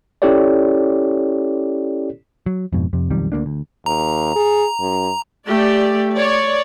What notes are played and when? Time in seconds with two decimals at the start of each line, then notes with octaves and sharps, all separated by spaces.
0.22 C#4 E4 G4 A4 C#5 D5
2.46 F#3
2.73 F2 G#2 B2
2.93 F2 C3
3.10 B1 F2 D#3 G3
3.32 D2 A#3 D4
3.46 D2
3.86 D#2 A#5
4.36 G#4
4.80 F#2
5.46 A3 G4 D5
6.12 C#5 D5